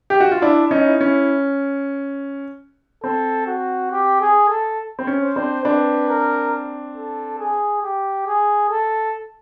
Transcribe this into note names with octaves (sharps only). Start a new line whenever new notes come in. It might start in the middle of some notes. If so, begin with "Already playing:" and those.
G4
F#4
F4
D4 E4
C#4 D#4
E4
C#4
C4 A4
F#4
G4
G#4
A4
C4
C#4
C5
C4 D4
C4 D4 B4
A#4
A4
G#4
G4
G#4
A4